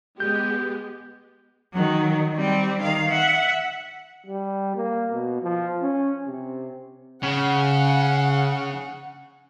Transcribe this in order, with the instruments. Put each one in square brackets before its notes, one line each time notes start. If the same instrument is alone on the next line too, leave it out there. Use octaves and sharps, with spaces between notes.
[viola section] G#3 B3 G4 [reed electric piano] G6
[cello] D#3 F#3
G3 C4
D#3 F5
E5 F#5
[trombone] G3
A#3
B2
F3
C#4
C3
[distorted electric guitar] C#3 [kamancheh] F#5